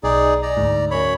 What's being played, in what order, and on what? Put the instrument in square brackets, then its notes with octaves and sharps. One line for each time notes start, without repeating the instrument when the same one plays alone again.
[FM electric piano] B1 [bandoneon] D#4 G#4 D5
[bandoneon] D5 A#5
[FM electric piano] D2 G#2
[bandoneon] F#2 C#5 B5